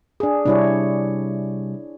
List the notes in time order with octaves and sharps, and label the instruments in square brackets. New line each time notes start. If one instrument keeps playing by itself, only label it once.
[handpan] D4 G#4
[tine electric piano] C3 G3 [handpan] D4 E4 C#5